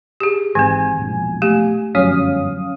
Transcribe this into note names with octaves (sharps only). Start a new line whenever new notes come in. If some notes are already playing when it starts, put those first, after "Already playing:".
G4 G#4
G#1 E3 C4 G#5
E1 A#1
A3 G4
G1 F#2 F3 F#3 C#4 F5 D#6